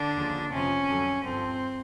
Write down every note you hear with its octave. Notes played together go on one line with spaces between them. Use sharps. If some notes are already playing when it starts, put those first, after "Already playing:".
Already playing: D3 D4
D#2 C#3 F3
F2 C3 F3 C#4
F2 D3 F#3
G2 D3 F3 C4